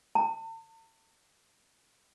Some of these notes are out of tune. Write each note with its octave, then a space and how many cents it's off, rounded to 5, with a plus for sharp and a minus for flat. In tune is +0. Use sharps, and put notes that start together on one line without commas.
A5 +40